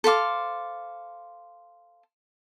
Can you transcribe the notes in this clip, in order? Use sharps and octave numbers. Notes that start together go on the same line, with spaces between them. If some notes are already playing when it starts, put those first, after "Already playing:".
A4 C5 F5 D6